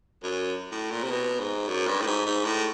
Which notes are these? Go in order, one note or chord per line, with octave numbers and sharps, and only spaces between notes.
F#2
A2
A#2
C3
B2
G#2
F#2
G2
A2
G#2
G#2
A2